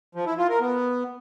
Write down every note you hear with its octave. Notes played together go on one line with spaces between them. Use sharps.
F3
E4
F4
A#4
B3